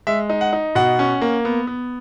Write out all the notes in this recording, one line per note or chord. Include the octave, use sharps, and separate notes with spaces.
G#3 E5
D#4
F#5
D#4
B2 F#5
C#4
A#3
B3
B3